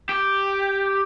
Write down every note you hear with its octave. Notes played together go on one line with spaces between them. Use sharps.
G4